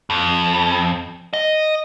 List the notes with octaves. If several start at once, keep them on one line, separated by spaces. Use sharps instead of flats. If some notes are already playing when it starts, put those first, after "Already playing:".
F2
D#5